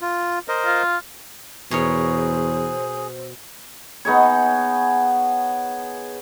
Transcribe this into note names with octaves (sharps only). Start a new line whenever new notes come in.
F4
A#4 C5 D#5
F4
E2 B2 G#4 A#4 C5 C#5
B3 D#4 G#4 C#5